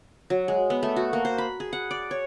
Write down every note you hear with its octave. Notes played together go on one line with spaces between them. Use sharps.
F#3
G#3
B3
A3
F#4
A#3
C5
B5
G#4
F#5
D5
C#5